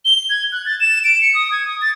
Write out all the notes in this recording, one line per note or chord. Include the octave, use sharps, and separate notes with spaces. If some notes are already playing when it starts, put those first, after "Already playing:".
G7
G#6
F#6
A6
E7
D7
C#7
D#6
G#6
D#6
A6